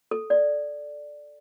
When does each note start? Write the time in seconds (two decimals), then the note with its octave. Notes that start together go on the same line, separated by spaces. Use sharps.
0.11 A4
0.30 D5